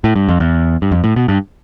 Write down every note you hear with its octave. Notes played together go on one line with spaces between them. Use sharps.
A2
G2
F2
E2
G2
F2
A2
B2
G2